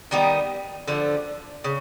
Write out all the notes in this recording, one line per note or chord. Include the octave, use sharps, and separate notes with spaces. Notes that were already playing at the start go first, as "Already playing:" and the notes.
D#3 G3 B3 D#4
D3 F3 A3
C#3